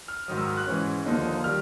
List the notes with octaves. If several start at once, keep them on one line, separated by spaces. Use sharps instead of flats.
F6
G#2 D#3 F#3 D#6
E6
F6
F#6
G#2 E3 G#3 C#4
D#2 D3 F3 A#3 D#4
D#3 G3 F6